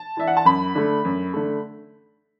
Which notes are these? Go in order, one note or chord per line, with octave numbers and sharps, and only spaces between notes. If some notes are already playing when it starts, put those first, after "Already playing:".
Already playing: A5
E3 D4 E5
F#5
A5
F#2 B5
D3 A3
F#2
D3 A3